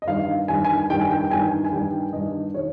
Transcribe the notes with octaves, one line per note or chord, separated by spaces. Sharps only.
D#5
G2 D#3 F5
G2 D#3 G#5
G#5
G2 D#3 G5
G#5
G5
G5
G2 D#3 G#5
G#5
G2 D#3 G5
G2 D#3 D#5
D#3 C#5